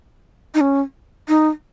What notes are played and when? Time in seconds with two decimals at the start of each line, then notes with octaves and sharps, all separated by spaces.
0.54 D#4
0.61 C#4
1.28 D#4